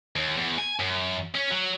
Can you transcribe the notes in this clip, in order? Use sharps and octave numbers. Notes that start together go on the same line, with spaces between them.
D#2
E2
G#5
F#2
C#4
F#3